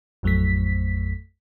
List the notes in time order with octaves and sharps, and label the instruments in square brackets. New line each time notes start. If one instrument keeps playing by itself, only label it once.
[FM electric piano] A1 F2 F#3 A3 B6